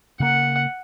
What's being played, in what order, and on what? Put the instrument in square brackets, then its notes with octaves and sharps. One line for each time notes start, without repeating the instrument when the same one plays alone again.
[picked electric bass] C#3 A#3 [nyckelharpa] F#5